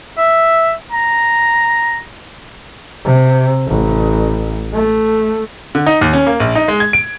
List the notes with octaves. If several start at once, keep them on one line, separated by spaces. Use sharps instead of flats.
E5
A#5
C3
A1
A3
D3
D#4
D#2
C#4
A#3
A#1
D#4
G#3
G#6
D7